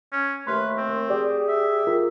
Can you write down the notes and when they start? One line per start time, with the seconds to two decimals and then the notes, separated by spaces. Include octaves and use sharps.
0.13 C#4
0.47 D#2 A3 B4 C6 F6 F#6
0.77 C4
1.10 G4 G#4 D5
1.48 E5
1.87 F4 A#4